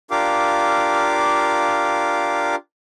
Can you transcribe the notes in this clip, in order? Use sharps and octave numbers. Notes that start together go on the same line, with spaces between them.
D4 F4 G4 A#4 F5 D6